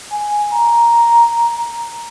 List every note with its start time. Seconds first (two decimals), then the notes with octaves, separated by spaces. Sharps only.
0.12 G#5
0.53 A#5